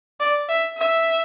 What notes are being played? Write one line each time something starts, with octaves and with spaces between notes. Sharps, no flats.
D5
E5
E5